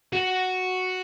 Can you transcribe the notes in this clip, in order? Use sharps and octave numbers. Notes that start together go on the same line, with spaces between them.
F#4